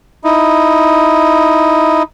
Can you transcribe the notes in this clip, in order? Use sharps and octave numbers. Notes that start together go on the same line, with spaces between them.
D#4 E4